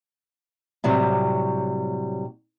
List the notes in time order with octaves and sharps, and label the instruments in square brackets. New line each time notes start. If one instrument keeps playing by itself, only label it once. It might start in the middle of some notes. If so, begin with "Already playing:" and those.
[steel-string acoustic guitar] A2 C3 F#3 G3